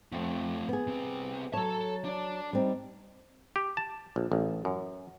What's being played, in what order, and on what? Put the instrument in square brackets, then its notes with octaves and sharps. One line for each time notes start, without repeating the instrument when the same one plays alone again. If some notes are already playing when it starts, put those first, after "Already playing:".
[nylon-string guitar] F2 [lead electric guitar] A3 C4
[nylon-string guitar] B3 G#4
[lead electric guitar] C2 C4
[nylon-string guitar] F#3 C#5 [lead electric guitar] A4 A5
[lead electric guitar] D4 D5
[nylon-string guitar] G3 C4 D#4
[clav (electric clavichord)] G4
A5
A#1
A1
F#2